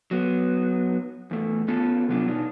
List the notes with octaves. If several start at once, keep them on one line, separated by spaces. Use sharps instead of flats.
F#3 B3
E2 A3
B3 C#4 F4 A4
C3 F#3 B3 D4 F4
B2 D4 D#4